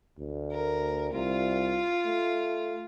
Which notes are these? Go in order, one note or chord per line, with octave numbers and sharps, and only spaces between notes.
D2
A#4
C2 F4
A3